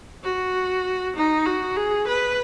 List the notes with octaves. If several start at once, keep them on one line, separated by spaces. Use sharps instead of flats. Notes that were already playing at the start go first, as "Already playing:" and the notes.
F#4
D#4
F#4
G#4
B4